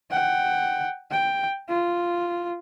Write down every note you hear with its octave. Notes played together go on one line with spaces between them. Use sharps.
F#5 G5
G5
F4